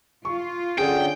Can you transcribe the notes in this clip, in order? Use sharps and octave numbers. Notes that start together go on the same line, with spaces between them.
F4 C#6
D3 C#4 G#4 G5